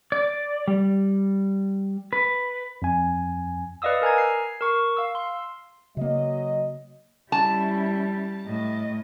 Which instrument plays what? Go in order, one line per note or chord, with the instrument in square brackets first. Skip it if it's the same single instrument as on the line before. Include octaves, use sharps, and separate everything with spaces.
[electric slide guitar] D5
G3
B4
[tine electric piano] F2 G#5
[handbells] B4 D5 D#5 F5 D#6 E6
A#4 G#5 A#5 G#6
C7
A#4 C#6
F5 E6
C6
[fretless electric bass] C#3 A#3 [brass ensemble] F#3 D#5
[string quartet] G3 [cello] C#4 E4 [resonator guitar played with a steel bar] A5
[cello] A2 D#5